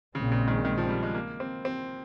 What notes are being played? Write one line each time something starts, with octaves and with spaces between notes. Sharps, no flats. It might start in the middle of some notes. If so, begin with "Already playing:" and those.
A#1 A#2 C#3 G#3 C4
C#3
D#3
D#3
F3
G3
G#3
A#3
C4
C4